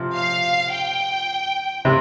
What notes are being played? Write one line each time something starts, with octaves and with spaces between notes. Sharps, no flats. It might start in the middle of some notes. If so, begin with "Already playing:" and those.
Already playing: C3 F3
F5
G5
C3